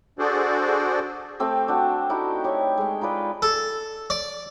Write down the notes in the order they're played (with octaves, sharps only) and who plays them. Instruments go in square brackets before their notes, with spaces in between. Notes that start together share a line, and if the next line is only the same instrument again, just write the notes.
[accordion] D4 F#4 G#4 A4 C5 D5
[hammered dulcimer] A3 C4 G4 A4
D4 F#4
D#4 E4 F#4 G4
G4 C#5
G#3 G5
D#4 F4 B4 D5
[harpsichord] A4
D5